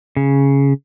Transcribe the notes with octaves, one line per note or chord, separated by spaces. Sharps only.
C#3